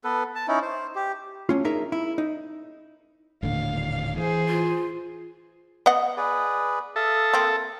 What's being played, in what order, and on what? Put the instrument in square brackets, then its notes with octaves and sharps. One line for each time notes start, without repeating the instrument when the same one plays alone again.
[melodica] B3 A4 B4
A5
C#4 D#4 E4
C5
G4
[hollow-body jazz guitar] A3 C#4 F4
D4 D#4 G#4 A#4 E5 A#5
E4
D#4
[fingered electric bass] D#1 A2 D3 [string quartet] F5
[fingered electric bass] E3 [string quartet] G#4 C5
[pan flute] F4
[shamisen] B3 D#5 F#5
[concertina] G#4 B4 D5
[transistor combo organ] A4 [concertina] E5 F5 D#6
[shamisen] A#3 C4